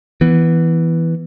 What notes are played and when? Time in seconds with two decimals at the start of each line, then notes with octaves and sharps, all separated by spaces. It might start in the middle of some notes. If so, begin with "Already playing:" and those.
0.21 E3 B3